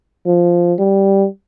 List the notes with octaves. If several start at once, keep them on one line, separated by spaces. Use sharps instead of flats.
F3
G3